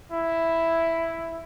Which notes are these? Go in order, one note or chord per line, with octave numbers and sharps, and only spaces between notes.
E4